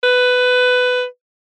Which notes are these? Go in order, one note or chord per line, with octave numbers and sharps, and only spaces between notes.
B4